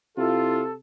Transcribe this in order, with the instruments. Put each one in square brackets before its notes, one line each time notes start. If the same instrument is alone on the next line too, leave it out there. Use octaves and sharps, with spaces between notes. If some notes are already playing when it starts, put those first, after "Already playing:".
[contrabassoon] C3 [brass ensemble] E4 F4 [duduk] A4